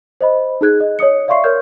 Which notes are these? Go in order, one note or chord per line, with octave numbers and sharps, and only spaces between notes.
C5 D#5 B5
D#4 G#4 F#6 G#6
D#5
C#5 D#5 D#6 C#7
D5 E5 F5 C6 C#6 C7
A#4 C#5 F6 G6 G#6